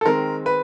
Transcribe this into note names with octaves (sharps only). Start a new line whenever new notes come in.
A4
D#3 G#3 C4 A#4
B4